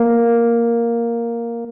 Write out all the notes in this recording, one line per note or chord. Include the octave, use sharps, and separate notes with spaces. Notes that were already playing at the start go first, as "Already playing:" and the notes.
Already playing: A#3